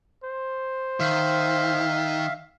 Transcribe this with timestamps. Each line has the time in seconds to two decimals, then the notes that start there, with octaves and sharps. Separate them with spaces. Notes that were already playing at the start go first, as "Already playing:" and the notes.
0.24 C5
1.00 D#3 E5 F5